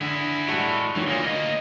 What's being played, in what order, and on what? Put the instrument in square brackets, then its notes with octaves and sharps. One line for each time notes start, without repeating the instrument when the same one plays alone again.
[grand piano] D3 [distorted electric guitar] E4 G#4
[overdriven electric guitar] A2 [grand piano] G3 G#3 F#4
[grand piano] D#3 F#3 C#5 [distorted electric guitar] E3
[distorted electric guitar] D2 A#3 [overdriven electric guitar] A#2 [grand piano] D#6
[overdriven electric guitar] D#5